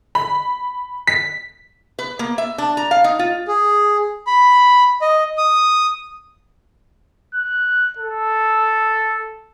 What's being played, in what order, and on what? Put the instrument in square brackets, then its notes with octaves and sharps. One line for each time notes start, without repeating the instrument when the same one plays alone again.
[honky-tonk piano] B5
B6
[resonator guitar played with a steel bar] B4
A#3
E5
D4
A#5
F5
D#4
F4
[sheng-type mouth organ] G#4
B5
D#5
D#6
[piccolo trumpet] F#6
A4